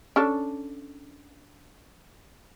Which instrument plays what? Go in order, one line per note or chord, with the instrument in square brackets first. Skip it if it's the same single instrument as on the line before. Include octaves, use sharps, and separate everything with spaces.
[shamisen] C#4 D4 A4